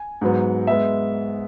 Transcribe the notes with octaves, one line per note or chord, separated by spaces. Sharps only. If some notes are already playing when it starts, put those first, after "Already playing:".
Already playing: G#5
G#2 F#3 B3
G#3 B3 E5